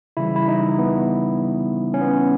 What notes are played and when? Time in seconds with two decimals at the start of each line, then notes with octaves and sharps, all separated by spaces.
0.17 C#3 E3 G3 E4
0.36 E4
0.48 D#4
0.79 B3
1.94 C#4
2.01 B3